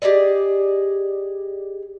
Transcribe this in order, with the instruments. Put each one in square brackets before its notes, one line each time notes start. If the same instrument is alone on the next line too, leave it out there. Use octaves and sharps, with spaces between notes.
[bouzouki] G4 G#4 D5 D#5